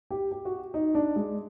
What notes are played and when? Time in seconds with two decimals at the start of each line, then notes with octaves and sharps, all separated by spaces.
0.11 G4
0.32 G4
0.45 F#4
0.74 D#4
0.95 D4
1.16 G#3